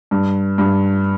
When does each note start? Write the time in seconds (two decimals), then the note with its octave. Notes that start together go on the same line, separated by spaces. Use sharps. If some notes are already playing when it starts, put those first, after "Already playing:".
0.11 G2
0.58 G2